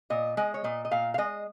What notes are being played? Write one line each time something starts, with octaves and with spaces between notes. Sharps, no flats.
A#2 D#5
G#3 D#5
C#5
A#2 D#5
D#5
A#2 F5
F5
G#3 D#5